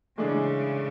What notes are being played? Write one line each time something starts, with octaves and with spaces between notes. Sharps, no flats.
A2 C#3 E3 G#3 D4 G#4